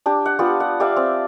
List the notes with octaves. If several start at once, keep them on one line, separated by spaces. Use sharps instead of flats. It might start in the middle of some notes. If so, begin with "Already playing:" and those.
D4 G4
F#5
B3 F4 G4 D5
F#5
G4 D5 E5 F5
C4